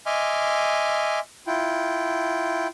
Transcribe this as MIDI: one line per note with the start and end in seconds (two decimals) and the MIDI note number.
0.06 1.19 75
0.06 1.19 76
0.06 1.19 80
0.06 1.19 84
0.06 1.19 86
0.06 1.19 89
1.47 2.67 64
1.47 2.67 65
1.47 2.67 79